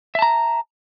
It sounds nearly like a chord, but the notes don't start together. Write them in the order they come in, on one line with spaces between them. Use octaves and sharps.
E5 A5 A#5